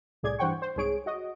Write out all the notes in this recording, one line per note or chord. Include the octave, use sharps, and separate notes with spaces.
C2 A2 G#4 D5 G#6
G2 E3 C5 F#5 G5 C#6
C5
C2 G#2 G#4 C#5 D7
F#4 D#5